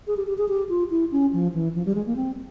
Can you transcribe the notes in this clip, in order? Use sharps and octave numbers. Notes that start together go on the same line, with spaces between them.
G#4
G4
G4
G#4
G4
F4
E4
C#4
F3
E3
F3
G3
G#3
A#3
C4